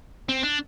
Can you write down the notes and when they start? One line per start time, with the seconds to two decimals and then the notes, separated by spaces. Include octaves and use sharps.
0.29 C4
0.43 D4